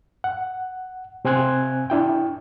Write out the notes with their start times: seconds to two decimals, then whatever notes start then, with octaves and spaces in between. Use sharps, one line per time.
0.24 F#5
1.25 C3 C4 G#5 C6 F#6 G#6
1.90 D4 E4 G5